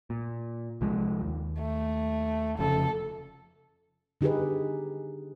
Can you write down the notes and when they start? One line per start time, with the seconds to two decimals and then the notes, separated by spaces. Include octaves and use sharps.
0.10 A#2
0.81 C2 F3 G#3
1.22 D#2
1.60 A3
2.59 F1 F2 C#3 A4
4.21 D3 D#4 G4 G#4 B4